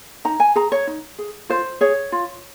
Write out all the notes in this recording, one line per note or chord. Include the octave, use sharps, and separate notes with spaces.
D#4 A#5
G#5
G#4 A#5
C#5
D#4
G#4
F4 C5
G#4 C#5
F4